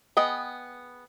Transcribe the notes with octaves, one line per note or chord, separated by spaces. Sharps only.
B3 G#4 D#5 G5